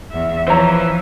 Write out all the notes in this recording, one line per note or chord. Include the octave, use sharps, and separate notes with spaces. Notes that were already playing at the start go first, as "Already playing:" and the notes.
E2 E5
E3 F3 C5 C#5 A#5